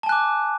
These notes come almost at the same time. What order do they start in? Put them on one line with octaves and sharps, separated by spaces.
A5 G#5 F#6 D6